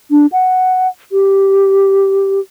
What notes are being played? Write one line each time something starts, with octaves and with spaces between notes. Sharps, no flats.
D4
F#5
G4